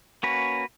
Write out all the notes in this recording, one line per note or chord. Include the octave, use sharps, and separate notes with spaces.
A#3 C#4 F#4 B4